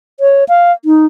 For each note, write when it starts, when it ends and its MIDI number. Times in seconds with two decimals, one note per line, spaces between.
0.20 0.44 73
0.49 0.72 77
0.85 1.06 63